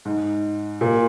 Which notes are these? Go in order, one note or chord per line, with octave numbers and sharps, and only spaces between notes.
G#2
A#2